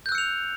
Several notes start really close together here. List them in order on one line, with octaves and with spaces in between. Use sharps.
G6 F#6 E6 C#7 F7